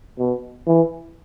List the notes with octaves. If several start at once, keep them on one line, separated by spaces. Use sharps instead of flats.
B2
E3